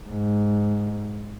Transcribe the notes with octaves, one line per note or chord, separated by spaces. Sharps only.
G#2